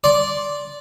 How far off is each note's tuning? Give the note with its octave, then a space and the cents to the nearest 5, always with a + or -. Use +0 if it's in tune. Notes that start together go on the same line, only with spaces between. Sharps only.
D5 -10 C6 +15